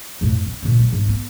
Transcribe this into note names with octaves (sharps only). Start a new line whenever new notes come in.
F2 A2
C#4
A#2 D3
G3
F2 G#2
B3